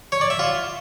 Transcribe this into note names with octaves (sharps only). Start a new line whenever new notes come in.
C#5
D5
E5
F4